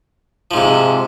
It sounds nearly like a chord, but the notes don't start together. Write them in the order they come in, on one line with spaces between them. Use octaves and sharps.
F3 G#2 C3